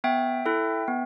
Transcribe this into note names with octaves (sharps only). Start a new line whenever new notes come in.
B3 E5 G5
E4 A4
B3